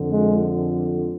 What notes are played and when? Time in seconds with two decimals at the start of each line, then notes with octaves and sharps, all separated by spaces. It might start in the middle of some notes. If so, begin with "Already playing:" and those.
Already playing: F2 D3 F3
0.11 G#3